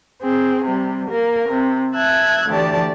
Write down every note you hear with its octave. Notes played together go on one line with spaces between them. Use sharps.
C4 G#4
C3 G3
A#3 A#4
C3
E5 A5 E6 F#6 G#6
D2 E3 A3 G4 D5 A5